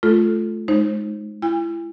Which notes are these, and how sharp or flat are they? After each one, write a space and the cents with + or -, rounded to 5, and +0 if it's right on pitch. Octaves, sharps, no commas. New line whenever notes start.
A3 -30 F4 +0 A4 +0
G#3 +20 D#4 +0 C5 +30
E4 +35 G#5 -45